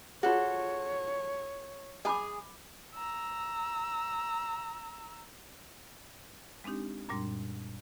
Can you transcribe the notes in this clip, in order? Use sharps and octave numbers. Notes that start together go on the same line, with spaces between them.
F4 F#4 G#4 A4 C5 C#5
G#4 D#5 G#5 B5 D6 D#6
A#5 E6
G#3 C4 D4 D#4 G4
F#2 A#2 G3 D4 C6